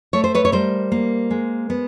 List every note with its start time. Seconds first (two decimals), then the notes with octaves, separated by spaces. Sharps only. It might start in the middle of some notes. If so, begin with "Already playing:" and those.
0.13 A3 C#5
0.24 C5
0.35 B4 C#5
0.45 C#5
0.52 G3 A#4 C5
0.92 A#3
1.31 G#3
1.70 B3